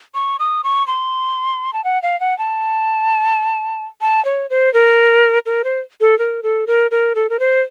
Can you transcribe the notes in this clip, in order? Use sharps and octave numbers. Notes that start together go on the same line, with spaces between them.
C#6
D#6
C#6
C6
A5
F#5
F5
F#5
A5
A5
C#5
C5
A#4
A#4
C5
A4
A#4
A4
A#4
A#4
A4
A#4
C5